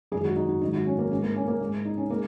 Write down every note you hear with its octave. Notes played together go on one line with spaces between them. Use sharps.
F#2 D#3 G#3 G#4
F#4
D#4
F#4
G#2 D#3 F#3 D#4
F#4
C#4
A#3
G#2 G#3 C#4
A#3
C#4
A#3
G#2 G#3
D#4
C#4
G#3 A#3